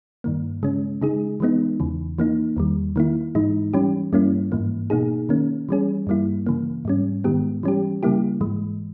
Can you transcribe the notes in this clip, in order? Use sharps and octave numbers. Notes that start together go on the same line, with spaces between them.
G2 D#3 A#3
C#3 G#3 C#4
C#3 G#3 D#4 G#4
E3 G#3 B3 D#4
E2 C#3 E3
E3 A#3 D#4
E2 D#3 G3
D#3 A#3 E4
G#2 E3 G#3 D#4
E3 G3 C#4 G4
G2 G3 A#3 C#4 E4
G#2 E3 A#3
B2 A#3 D#4 G#4
D#3 A#3 C#4
E3 G3 C#4 G#4
G2 G3 A#3 E4
C#3 E3 A#3
G#2 G3 C#4
G#2 D#3 G#3 B3 G4
E3 G3 C#4 G4
C#3 G3 A#3 E4 G4
G#2 E3 G#3